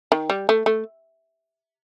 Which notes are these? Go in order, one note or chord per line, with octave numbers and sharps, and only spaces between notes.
D#3
G3
A3
A3